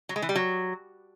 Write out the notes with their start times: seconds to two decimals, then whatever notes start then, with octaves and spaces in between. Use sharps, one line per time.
0.09 F#3
0.16 G#3
0.22 E3
0.29 G3
0.35 F#3